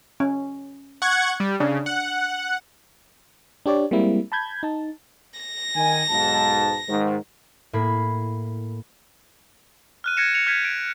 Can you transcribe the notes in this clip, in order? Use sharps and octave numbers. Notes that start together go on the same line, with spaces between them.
C#4
F#5 C#6 G#6
G3
C#3 D4
F#5
D4 G4 C#5 D5
G3 G#3 A#3 C4 E4
A5 B5 G6 G#6
D#4 A5
A#6
D#3 G#5
B1 G#2 A5
G#2 D#3
A2 A#3 B5 G#6 C7
F6 F#6 D#7
G#6 A#6 C#7 E7
C#7 F7
F6 G6 G#6 B6 D#7
D7